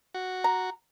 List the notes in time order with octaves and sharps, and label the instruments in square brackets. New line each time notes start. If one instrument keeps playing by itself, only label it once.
[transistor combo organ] F#4
[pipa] A#5